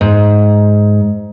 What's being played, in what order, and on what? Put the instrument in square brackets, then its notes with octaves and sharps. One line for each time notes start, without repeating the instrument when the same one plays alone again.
[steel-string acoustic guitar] G#2